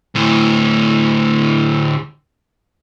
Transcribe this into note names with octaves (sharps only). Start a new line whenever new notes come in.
D2 A2